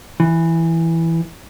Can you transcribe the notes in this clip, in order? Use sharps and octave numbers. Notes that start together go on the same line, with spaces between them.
E3